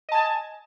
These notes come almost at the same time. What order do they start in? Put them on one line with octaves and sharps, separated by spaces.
D#5 A5 G#5